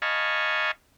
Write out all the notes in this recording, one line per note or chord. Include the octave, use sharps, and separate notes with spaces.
D#5 F5 G#5 A5 B5 C#6